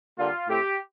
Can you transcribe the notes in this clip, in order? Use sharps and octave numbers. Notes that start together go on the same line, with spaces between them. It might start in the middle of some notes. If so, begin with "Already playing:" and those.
D3 G3 A#3 F4
A2 A3 C4 G4